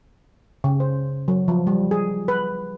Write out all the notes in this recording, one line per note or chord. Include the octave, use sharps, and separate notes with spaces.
C#3
C5
F#3
F3
G3
G#4
B4